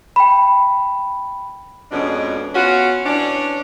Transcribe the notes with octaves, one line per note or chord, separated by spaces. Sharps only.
G5 B5
F2 B2 G#3 C#4 D4
B3 C#4 F4 F#4
E3 C#4 D4